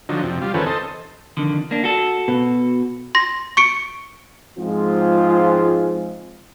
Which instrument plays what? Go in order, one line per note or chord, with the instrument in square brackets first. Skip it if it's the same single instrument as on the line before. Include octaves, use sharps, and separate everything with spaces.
[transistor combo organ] D3 F3 F#3 D#4
F2 C3
G3 F4
E2 D#3 C4 C#4 A4 B4
A4 C5 D#5
[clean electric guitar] F2 D3 D#3
A#3 D4
F#4 A4
[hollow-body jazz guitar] B2
[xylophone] C6 A#6
C#6 C#7 D7
[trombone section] G#2 F3 G#3 C4 F4